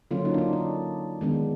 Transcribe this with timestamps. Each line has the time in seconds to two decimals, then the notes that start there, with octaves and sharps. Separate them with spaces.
0.11 D3 F#3 A#3 C#4 F4
0.25 D#4
0.34 D4
0.38 D#4
0.53 D4
1.21 D#3 G#3 B3 D4